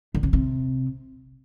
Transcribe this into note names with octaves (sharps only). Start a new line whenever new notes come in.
D3
C#3
C3